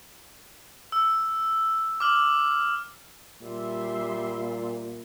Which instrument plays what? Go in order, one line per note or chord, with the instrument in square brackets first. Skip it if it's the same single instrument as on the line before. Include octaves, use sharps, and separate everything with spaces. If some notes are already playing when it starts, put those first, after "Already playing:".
[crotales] E6
D6 F6 F#7
[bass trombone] A#2 [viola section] G3 E5 C6